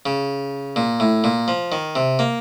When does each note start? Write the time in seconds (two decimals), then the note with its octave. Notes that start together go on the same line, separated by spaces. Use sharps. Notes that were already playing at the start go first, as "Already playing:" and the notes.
0.06 C#3
0.76 A#2
1.00 A2
1.24 A#2
1.48 F3
1.72 D#3
1.95 C3
2.19 A#3